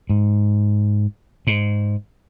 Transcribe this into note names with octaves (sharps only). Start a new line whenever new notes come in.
G#2
G#2